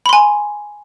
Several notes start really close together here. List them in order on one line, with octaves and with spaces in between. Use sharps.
B5 C6 G#5